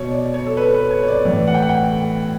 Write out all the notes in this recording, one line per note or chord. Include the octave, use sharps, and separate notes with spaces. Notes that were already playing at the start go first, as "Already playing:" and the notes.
Already playing: B2 C#5
D5
C#5
A4
B4
B4
C#5
C#5
D5
A2 E3 D5
F#5
G5
F#5
G5